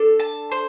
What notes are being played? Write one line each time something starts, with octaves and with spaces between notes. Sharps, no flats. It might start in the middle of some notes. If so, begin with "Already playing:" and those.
Already playing: D4 A4
A5
C5